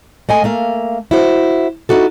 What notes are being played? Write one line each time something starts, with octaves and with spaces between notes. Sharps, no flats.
A3 D#5 G#5
A3 A#3 F5
E4 F#4 C5
D#4 E4 F#4 A4